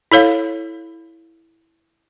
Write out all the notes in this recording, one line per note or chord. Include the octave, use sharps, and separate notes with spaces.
E4 A4 C#5 F5